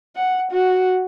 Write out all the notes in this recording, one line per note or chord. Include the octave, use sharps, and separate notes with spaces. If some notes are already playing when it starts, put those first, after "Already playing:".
F#5
F#4